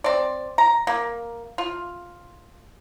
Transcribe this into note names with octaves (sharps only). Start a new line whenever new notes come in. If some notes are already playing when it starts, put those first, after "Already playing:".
C4 D5
A#5
A#3
F4